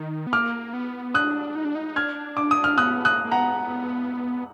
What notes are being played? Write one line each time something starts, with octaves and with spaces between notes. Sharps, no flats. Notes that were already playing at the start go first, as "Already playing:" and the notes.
Already playing: D#3
B3
A#3 D6 F6
B3
D4 D#6 F#6
D#4
D4
D#4
D4 F6 G#6
D6
D#6
F6
B3 D#6 F#6
A#3 D#6 F#6
A#3
B3 F#5 A#5